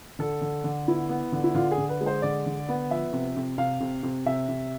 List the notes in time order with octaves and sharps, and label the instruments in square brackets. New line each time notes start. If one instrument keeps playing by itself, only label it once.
[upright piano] D3 A4
D3
D3
B3 E4
B3
D3
E4
D3 F4
G#4
D3
B4
G#3
C5
D3 D5
D3
B3
F3 E5
C3
C3
C3 F5
C3
C3
C3 E5
C3